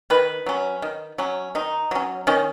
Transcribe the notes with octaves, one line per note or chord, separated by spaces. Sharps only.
D#3 B4
F#3 C#4
D#3
F#3 C#4
D#3 D#4
F#3 C#4
D#3 C#4